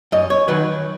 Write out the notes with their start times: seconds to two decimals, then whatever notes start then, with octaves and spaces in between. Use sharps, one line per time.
0.12 F#2 D#5
0.30 C#5
0.48 D#3 F#3 B4